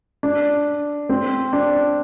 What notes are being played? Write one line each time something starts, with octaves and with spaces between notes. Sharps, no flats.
D4
C4
D4